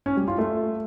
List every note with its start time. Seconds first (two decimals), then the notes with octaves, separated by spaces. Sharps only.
0.06 C#4
0.17 G3
0.28 F4
0.38 A3